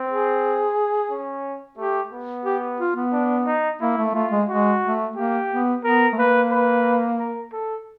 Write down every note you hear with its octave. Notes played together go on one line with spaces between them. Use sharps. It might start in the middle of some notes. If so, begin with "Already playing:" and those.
Already playing: C4
G#4
C#4
A3 G4
B3
G4
F4
B3
D4
D#4
A#3 E4
A3
A3 F4
G#3
G#3 F#4
A3
A#3 G4
B3
B3 A#4
A3
A#3 B4
B4
A#4
A4